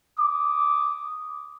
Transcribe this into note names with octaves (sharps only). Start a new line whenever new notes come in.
D6 D#6